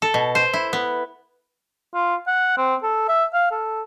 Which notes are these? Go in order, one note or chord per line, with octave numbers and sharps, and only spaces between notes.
A4
B2
C5
E4
B3
F4
F#5
C4
A4
E5
F5
A4